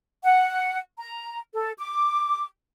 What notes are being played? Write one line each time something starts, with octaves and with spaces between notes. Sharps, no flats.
F#5
A#5
A4
D6